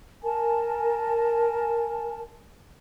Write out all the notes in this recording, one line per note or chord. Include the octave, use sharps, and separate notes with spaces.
A#4 G#5 A5